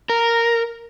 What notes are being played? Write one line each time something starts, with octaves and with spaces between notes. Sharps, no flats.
A#4